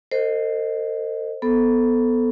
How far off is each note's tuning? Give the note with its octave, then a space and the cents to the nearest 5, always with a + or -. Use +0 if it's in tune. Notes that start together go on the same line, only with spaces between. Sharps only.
A4 +45 C5 +0 D#5 +0
B3 +0 A4 +0 C5 +5